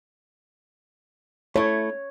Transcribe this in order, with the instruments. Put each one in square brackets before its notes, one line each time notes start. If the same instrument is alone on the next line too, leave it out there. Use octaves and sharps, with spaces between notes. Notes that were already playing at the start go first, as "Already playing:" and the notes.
[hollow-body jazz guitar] A3 E4 [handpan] C#5